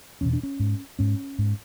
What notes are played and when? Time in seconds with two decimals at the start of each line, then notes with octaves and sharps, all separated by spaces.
0.21 E2 B2 C#4
0.33 D4
0.43 C#4
0.60 G#2
0.99 G#2 C#4
1.39 G#2